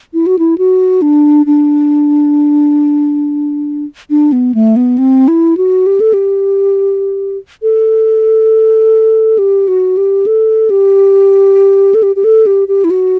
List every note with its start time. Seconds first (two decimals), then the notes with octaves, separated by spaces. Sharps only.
0.14 E4
0.26 F#4
0.39 E4
0.58 F#4
1.02 D4
1.46 D4
4.10 D4
4.32 B3
4.54 A3
4.76 B3
4.98 C4
5.28 E4
5.57 F#4
5.87 G4
6.00 A4
6.14 G4
7.62 A4
9.38 G4
9.68 F#4
9.97 G4
10.26 A4
10.70 G4
11.94 A4
12.03 G4
12.16 G4
12.24 A4
12.46 G4
12.68 G4
12.84 E4
12.90 F#4